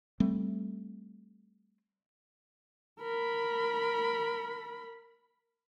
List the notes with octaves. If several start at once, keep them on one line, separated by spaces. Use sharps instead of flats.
G3 A3 C4
A#4 B5